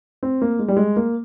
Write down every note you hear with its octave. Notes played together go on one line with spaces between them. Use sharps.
C4
A#3
G#3
G3
G#3
A#3